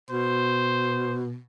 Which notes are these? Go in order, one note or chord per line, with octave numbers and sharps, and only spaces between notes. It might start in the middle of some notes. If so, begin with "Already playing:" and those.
B2 C5